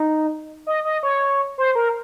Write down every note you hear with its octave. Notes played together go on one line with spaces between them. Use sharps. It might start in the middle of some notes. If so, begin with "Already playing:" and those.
Already playing: D#4
D#5
D#5
C#5
C5
A#4